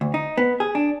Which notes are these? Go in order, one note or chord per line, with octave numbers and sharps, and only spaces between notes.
D2
D#4
B3
G#4
D4